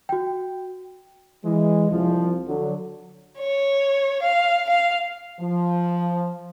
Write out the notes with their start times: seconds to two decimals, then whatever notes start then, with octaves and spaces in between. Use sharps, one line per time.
0.09 F#4 G5
1.44 E3 G#3
1.90 C2 F3
2.46 D3 F#3
3.39 C#5
4.23 F5
4.70 F5
5.39 F3